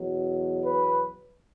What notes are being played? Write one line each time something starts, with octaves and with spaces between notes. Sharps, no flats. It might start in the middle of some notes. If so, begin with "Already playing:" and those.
Already playing: E2 B2 F#3
B4